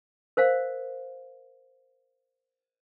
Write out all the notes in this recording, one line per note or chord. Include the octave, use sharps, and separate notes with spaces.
A#4 C5 F5